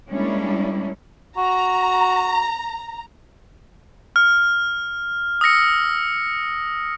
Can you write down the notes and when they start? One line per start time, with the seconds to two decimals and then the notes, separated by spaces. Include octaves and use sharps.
0.10 G3 G#3 A#3 C#4 D4 E4
1.37 F#4 A#5
4.16 F6
5.41 D#6 E6 A#6 C#7